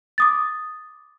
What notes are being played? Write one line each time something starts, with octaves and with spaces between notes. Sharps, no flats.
D6 D#6 A6